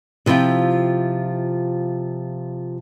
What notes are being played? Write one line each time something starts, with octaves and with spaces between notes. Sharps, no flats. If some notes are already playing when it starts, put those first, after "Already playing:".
C3 F3 E4 F4 G5